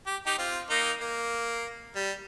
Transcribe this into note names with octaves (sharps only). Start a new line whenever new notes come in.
G4
D#4 G4
C4 F4
A#3 D#4
A#3
G3